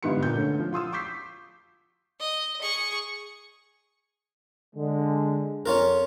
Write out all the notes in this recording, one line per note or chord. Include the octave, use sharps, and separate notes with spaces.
G1 G#2 G3 B3 C6 C#7
A#2 G6
D3 A3 C#4
F3
F4 C6 D#6 E6
C#6 D6 E6 G6 B6 C7
D#5
G#4 C#6
D3 G#3
F2 C#4 F4 A#4